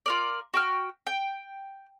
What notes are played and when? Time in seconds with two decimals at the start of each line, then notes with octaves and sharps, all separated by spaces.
0.06 F4 A#4 D5
0.54 F#4 G5 F6
1.07 G5